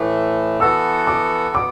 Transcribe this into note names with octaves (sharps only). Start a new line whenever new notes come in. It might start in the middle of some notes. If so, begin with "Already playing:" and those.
Already playing: A2 E3 A3
E3 B3 F#4 A4 E6
D6
B3 D6